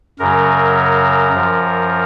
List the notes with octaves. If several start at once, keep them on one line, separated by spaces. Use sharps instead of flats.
F#2 C#3 F#3 A#4
F#2 F3